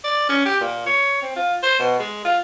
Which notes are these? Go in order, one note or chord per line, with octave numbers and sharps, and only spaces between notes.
D5
C#4
G4
A#2
C#5
C4
F4
C5
B2
G#3
F4